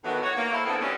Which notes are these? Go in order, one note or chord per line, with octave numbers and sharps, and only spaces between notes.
A2 D#3 E3 F#3 B3 F#4
F#4 C#5
A#3
E4 A4 C5
A2 D3 B3 C4 G#4 A4
E3 F#3 G3 C#4 D4